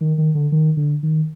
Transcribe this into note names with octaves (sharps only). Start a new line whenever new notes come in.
D#3
D#3
D3
D#3
D3
D#3